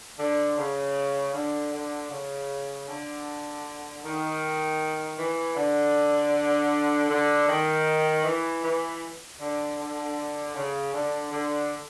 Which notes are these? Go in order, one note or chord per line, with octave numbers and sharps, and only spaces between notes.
D3
C#3
D3
D3
C#3
D3
D#3
E3
D3
D3
D#3
E3
E3
D3
D3
C#3
D3
D3